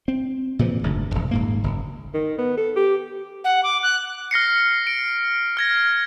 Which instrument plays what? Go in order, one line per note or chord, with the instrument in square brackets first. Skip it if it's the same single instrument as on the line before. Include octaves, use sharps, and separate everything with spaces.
[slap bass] C4
A#2 C#3 E3 F3
F#1 D2 G#2
D#1 G#1
D#1 G#2 A#3
F#1
[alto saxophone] D#3
B3
A4
G4
[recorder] F#5
D6
F#6
[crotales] F6 A#6 C7 C#7
D7
F6 G#6 A#6